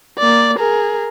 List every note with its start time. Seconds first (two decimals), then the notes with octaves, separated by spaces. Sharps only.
0.19 A#3 D5
0.59 G#4 A#4